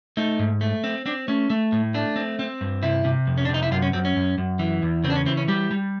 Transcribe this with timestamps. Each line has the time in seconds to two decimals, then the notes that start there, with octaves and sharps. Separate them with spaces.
0.17 A3 D#4
0.39 G#2
0.61 A3
0.84 C4
1.06 C4 D4
1.28 A3 C#4
1.50 A3
1.72 A2
1.94 A3 D4
2.16 C4
2.39 C4
2.61 G2
2.83 C3 E4
3.05 C3
3.27 F2
3.37 C#4
3.45 D4
3.49 C3
3.54 D#4
3.63 E4
3.71 F#2 F4
3.82 C#4
3.93 F#2 C4
4.05 C#4
4.16 F#2
4.38 F#2
4.59 E3
4.82 E2
5.04 C#3 C4
5.10 D4
5.16 C#4
5.26 E3 C4
5.37 C#4
5.48 G3 G4
5.71 G3